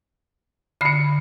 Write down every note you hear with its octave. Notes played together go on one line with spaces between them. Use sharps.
D3 B5 F6 C7 C#7